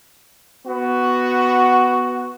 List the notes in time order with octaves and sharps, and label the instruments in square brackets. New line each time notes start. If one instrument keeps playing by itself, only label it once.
[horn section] B3 F#4